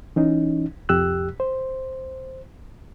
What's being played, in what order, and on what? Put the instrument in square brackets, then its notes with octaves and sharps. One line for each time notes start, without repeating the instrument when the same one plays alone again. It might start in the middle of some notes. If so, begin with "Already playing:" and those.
[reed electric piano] E3 C#4 D#4
C2 F2 G4 E6 F#6
C5